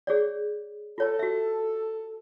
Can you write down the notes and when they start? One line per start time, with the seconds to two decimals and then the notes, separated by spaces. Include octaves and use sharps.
0.07 G#4 C#5 D5
0.98 F4 A4 C#5 A5
1.19 F#4 E5